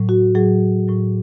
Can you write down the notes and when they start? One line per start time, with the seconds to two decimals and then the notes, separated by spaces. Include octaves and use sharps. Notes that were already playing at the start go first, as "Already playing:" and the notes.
Already playing: A2 F#3
0.09 F#4
0.35 A2 F#3 G#4
0.88 A2 F#3